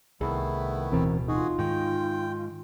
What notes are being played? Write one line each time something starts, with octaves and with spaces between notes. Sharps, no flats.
C2 D#3 A3 B3 E4 G#4
D1 B2 E3 C4 A#4
D#4 F4 F#4 G#4
G#2 D#3 G5